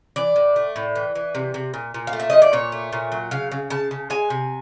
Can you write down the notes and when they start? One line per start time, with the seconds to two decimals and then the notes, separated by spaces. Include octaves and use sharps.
0.16 E3 D5
0.36 A2
0.56 A3
0.76 A2
0.95 E3
1.15 E3
1.35 C3
1.54 C3
1.74 A#2
1.94 A#2
2.07 F5
2.13 A3
2.20 E5
2.30 F3 D#5
2.42 D5
2.53 A#2 C#5
2.72 A3
2.92 A#2
3.12 F#3
3.31 C#3 F5
3.51 C#3
3.70 C#3 A5
3.91 C#3
4.10 G#3 G#5
4.30 C3